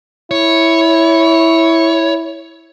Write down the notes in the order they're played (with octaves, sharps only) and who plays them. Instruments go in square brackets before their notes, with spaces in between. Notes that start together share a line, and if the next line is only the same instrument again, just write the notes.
[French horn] E4 [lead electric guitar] C#5